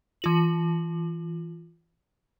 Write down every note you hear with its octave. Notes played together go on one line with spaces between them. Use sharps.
E3 F4 F#7